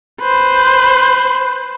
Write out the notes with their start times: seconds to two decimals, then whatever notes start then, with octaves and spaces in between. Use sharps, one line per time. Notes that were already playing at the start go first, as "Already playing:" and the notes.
0.21 B4 C5